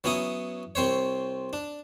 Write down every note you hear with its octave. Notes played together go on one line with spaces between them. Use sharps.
F#3 B3 C#4 E4 D#6
C2 C4 C5 C#5
D4